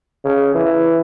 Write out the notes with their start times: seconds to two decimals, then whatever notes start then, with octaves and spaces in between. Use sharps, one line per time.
0.25 C#3
0.55 E3